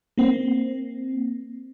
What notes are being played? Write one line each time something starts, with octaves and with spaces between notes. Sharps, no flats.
A#3 C4